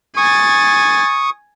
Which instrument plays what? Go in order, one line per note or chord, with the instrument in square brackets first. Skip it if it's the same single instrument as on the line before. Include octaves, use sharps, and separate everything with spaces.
[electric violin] G#5 A6 [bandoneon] C#6 D#6